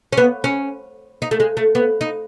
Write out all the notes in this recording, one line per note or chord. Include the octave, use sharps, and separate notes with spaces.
C#4
B3
C#4
D#4
A3
G#3
A3
B3
D#4